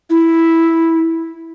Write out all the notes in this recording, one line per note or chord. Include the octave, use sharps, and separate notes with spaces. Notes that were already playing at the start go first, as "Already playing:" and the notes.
E4